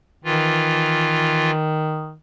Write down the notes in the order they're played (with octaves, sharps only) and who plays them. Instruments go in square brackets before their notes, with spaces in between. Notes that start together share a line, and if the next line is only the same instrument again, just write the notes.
[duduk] D#3 [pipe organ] E3 F4